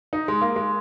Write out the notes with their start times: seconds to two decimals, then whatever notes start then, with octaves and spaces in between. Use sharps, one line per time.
0.13 D#4
0.28 G#3
0.41 A#3
0.56 G#3